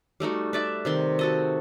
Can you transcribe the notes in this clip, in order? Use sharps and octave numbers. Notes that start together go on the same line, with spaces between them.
G3 A3 D#4 F#4
B4 D5 E5
C3 D#3 C6
F#4 A4 D#5